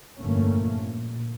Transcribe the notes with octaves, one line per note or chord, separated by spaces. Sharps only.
G1 F2 A#2 A3 A#3 C#4
A#2